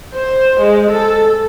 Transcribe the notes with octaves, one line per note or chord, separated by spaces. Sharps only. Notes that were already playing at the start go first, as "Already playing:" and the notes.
C5
G#3
A4